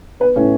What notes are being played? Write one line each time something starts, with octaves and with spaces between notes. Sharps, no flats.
B3 B4
A2 C#4